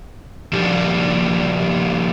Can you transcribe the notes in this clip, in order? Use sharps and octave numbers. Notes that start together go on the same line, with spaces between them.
A#2 F3 G3 D4 G4